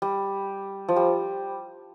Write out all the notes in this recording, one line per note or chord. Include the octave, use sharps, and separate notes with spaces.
G3
F3
G3